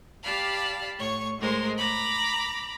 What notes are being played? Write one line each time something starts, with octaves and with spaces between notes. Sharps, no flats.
G4 D5 F5 A5 B5 F6
A2 C#5 C#6
A2 G#3 A#4 C5
A#5 B5 D6